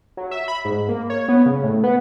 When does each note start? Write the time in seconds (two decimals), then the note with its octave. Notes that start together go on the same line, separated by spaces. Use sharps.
0.17 F#3
0.31 E5
0.48 B5
0.65 G#2
0.88 A#3
1.10 C#5
1.29 B3
1.46 C#3
1.63 A2
1.84 B3